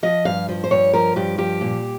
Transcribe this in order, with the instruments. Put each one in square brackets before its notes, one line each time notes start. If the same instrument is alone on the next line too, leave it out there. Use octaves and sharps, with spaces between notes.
[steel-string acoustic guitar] F3 D#5
G2 F5
F3
C5
G2 C#5
F3 A#4
G2 G4
F3 G4
A#2